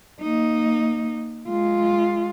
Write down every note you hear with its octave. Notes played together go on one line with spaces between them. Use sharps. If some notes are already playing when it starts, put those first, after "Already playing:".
A#3 D#4
G#3 F4